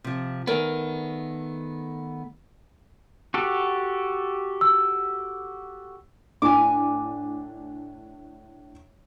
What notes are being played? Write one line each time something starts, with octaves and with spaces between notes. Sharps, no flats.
C3 F3
D#3 A3 B3 A#4 D5 G#5
F#4 G4 A4
E6
A2 D4 G#5 D6